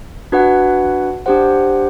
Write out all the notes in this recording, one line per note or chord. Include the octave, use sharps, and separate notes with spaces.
D4 F#4 B4 F#5
D4 G4 C5 F#5